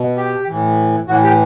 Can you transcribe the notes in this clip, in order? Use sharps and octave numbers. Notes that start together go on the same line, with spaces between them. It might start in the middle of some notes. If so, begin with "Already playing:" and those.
Already playing: B2
G4
A2 E3
A2 E3 F#4
G4